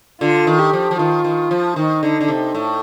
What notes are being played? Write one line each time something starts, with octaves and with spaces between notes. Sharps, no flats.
D3 F4
D#3
G4
F3
F3
D#3 F4
D#3
F3
D#3 D#4
D3
D3
C3
A2